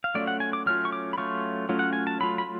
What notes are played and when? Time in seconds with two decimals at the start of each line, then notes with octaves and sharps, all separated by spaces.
0.04 F5
0.15 F#3 A3 C#4 F4 D5
0.27 F#5
0.40 G#5
0.53 D6
0.66 F#3 A3 C#4 F4 F6
0.85 C#6
0.92 D6
1.13 B5
1.18 F#3 A3 C#4 F4 C#6
1.69 F#3 A3 C#4 F4
1.79 F#5
1.93 G#5
2.07 A5
2.20 F#3 A3 F4 B5
2.38 B5